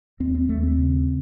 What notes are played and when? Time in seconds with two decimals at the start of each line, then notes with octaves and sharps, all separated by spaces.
0.20 D#2 C4
0.35 C4
0.49 D#2 A3
0.63 C4
0.78 C#3